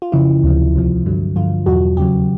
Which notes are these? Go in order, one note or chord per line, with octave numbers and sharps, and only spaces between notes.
F4
F2 C#3 E3 E4
D2 C3 F3
C2 C3 F3
G2 D3 F#3
G2 D3 F3 F4
E2 B2 F#3 F#4
D#2 C#3 F#3 G4